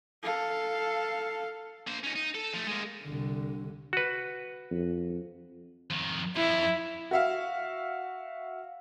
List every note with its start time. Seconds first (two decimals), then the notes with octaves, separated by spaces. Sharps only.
0.23 A4 F5
1.87 A#3 C5
2.04 C#4 D#4
2.16 D#4
2.35 A4
2.54 F3 A3
2.67 G#3 A#3
3.03 C2 D3
3.93 F#4 B4
4.71 F2
5.90 F2 D#3
6.36 F2 E4
7.11 F#4 E5 F5